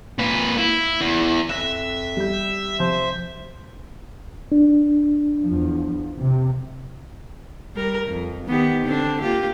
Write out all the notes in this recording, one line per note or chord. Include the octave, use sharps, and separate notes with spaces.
A#2 B4
E4
E2
F2 E5 F#6 A#6
G3 G6
C3 F3 C5
D4
E2 F3
C3
G3 A#4
F2
D#3 B3 G4
D3 C4 D4
A#3 F4 G4